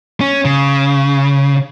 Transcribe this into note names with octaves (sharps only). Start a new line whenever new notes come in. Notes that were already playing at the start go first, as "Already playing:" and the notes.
C#4
C#3